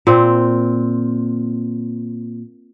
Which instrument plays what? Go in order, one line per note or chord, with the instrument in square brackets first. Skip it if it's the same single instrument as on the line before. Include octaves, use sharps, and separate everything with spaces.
[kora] A#2 C4